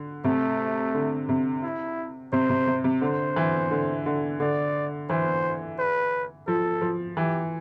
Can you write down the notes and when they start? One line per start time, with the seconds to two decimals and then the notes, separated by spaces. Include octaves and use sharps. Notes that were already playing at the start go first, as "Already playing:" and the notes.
Already playing: D3
0.24 C3 A3
0.94 D3
1.29 C3
1.63 E4
2.32 C3 C5
2.50 C3
2.67 C3
2.84 C3
3.02 D3 C5
3.36 E3
3.71 D3
4.06 D3
4.40 D3 D5
5.09 E3 C5
5.78 B4
6.47 F3 A4
6.82 F3
7.17 E3 G4